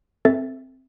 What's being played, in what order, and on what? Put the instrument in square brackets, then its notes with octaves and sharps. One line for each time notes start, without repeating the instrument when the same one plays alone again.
[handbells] C4 E5 A6 [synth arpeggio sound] A4